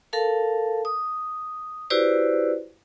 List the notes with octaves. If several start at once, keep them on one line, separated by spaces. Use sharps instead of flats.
A4 A#4 F5 A5
D#6
E4 F#4 G4 B4 C5 D5